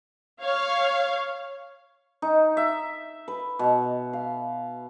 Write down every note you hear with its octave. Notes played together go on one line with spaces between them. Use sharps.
C#5 F5
D#4
E5
B4
B2
F5